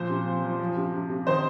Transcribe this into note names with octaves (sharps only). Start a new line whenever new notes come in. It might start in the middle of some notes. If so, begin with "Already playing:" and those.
Already playing: A#2 F3 C5
C3
F3
F3
F3
C3
C3
C3
D#3 C5